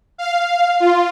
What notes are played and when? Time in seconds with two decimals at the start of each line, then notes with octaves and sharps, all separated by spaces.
0.18 F5
0.80 F4